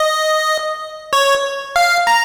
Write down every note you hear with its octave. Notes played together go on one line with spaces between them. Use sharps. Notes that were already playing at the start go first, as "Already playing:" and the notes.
Already playing: D#5
C#5
F5
A#5